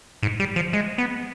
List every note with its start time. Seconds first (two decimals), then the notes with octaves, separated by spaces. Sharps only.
0.23 G#2
0.40 G3
0.56 F3
0.73 G#3
0.98 B3